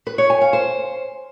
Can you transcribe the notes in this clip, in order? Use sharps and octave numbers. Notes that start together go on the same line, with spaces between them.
B4
C#5
G#5
F5
C5